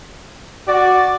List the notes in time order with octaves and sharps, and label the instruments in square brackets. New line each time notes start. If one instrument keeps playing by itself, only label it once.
[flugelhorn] F#4 [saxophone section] D5